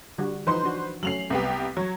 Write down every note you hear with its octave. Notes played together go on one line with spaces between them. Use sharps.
D3 G3 F#4
E3 F3 D#4 B4 C5 C6
D4 F#4
F#3 A3 C#4 C7 F7 F#7
C2 B3 G4
F#3 C#5